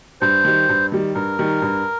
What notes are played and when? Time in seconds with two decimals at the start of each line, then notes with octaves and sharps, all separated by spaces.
0.21 G2 C5
0.45 D#3 G3
0.69 G2
0.92 D#3 G3
1.15 G2 A#4
1.39 D#3 G3
1.62 G2